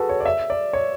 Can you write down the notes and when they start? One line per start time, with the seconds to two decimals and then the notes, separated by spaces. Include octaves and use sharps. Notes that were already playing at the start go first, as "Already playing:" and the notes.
Already playing: F#4 G#4 A4 B4
0.09 C#5
0.20 D5
0.25 E5
0.50 D5
0.73 C#5